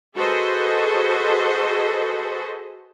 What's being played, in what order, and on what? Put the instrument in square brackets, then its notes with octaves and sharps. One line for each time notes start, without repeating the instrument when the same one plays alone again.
[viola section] F#4 G#4 A4 B4 C5 D#5